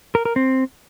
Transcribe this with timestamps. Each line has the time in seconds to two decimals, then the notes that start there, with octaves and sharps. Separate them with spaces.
0.15 A#4
0.25 A#4
0.36 C4